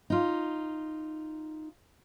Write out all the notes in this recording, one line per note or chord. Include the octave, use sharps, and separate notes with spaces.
D#4 F4